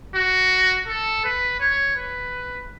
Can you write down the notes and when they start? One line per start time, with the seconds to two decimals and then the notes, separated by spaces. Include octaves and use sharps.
0.15 F#4
0.87 A4
1.24 B4
1.60 C#5
1.96 B4